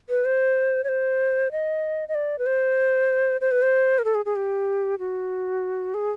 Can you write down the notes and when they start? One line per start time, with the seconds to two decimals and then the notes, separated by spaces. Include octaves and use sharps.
0.09 B4
0.25 C5
0.84 C#5
0.89 C5
1.52 D#5
2.09 D#5
2.15 D5
2.39 B4
2.46 C5
3.41 C5
3.52 B4
3.62 C5
3.99 A#4
4.05 A4
4.15 G#4
4.26 G#4
4.36 G4
4.99 F#4
5.94 G#4